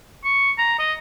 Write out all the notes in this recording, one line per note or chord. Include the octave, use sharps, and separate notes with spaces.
C#6
A#5
D#5